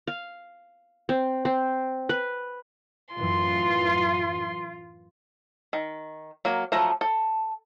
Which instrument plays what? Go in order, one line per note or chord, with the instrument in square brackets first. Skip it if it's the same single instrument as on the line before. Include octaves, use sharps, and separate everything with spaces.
[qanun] F5
C4
C4
B4
[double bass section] F#2 A2 E3 [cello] F4 [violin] C6
[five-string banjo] D#3
F#3 A#3
F3 F#3 A3 A#5
A4